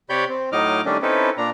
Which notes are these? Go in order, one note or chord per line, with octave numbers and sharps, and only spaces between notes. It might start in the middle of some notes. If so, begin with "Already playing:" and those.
C3 G4 C#5 D5 B5 G6
C4
A2 F#3 D#4 D#5 D6 F6
D#3 G3 A3 C#4 D4
C4 C#4 D#4 E4 A4 B4
A#2 D4 A#5